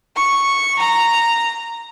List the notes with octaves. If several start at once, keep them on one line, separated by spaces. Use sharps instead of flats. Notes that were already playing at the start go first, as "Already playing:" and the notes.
C#6
A#5